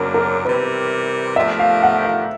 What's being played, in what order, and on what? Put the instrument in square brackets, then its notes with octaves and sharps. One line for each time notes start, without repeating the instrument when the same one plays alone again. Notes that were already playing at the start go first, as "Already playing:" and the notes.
Already playing: [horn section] F#2 C#3 F#3 A#3 D4 [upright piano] A#4
[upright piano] A#4
[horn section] C3 E3 G3 [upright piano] B4
[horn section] F3 A3 D4 G4 A#4 [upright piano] E5
[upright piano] F5
F#5
F5